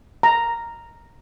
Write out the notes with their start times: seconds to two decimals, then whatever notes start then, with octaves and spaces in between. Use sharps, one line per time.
0.23 A#5